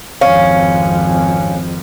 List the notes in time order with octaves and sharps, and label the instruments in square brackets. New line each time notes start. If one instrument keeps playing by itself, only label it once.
[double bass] G#1 F2 [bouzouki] C#4 [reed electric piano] F5